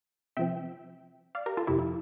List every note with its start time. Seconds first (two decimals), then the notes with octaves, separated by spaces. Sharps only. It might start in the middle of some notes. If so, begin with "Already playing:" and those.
0.37 C3 F3 C4 E5 G5
1.35 D5 F5
1.46 G4 A#4
1.57 F4 A4
1.67 F2 C3 F3 E4 G4
1.79 E4